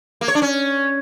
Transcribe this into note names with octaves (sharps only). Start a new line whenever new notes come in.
A#3
C#5
D4
C#4